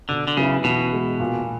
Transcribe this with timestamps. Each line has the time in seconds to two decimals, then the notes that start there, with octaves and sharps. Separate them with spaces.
0.09 B2 D3
0.28 D3
0.37 C#3 F#3 B3 E4
0.64 B2 E3
0.93 G#3 B3
1.20 A#2